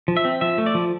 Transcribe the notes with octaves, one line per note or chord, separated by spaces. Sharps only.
F3
E5
C4
F3 E5
A3
D5
F3